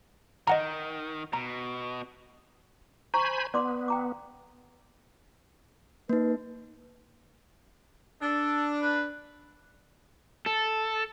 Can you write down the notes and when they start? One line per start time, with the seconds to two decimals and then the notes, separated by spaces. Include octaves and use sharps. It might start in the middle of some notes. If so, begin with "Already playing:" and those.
0.47 D#3 D#5 F#5 A#5
1.33 B2 A#5
3.14 C5 G#5 A#5 B5 C#6
3.54 B3 D5 C6 D6
3.88 G5 A#5 D6
6.09 A#3 D#4 B4
8.22 D4 A4
8.81 B4
10.46 A4